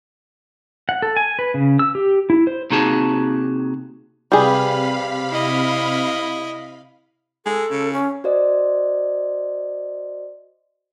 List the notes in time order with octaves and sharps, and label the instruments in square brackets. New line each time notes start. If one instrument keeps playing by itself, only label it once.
[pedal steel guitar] F#5
A4
G#5
B4
C#3
E6
G4
E4
C5
[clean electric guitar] C3 A#3 D#4 F#4 G#4 A5
[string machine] C3 F5 B5 [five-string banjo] G3 G#4 [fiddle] B4
[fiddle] E4 D#5
[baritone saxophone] G#3 [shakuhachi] A4
[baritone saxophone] C#3
[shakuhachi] C#4
[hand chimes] F#4 C5 D5 D#5